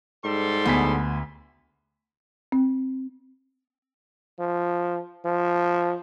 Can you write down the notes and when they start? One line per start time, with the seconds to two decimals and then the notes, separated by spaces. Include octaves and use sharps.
0.24 G#2 G3 A4 C6
0.66 D2 B3 G#5 B6
2.52 C4
4.40 F3
5.25 F3